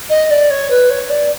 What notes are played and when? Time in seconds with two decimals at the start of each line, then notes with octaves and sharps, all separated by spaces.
0.09 D#5
0.30 D5
0.50 C#5
0.70 B4
0.90 C#5
1.09 D5